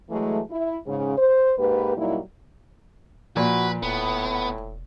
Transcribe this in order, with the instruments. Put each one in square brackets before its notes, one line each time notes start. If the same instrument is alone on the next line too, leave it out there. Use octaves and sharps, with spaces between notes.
[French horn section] E3 F#3 G#3 A3
E4
G#2 C#3
C5
G#2 A#3 G4 B4
A#2 F#3 G3 A#3 D#4 E4
[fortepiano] A#2 [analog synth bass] F3 [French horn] F#4 [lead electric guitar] B4
[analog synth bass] E1 [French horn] A2 [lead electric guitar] B3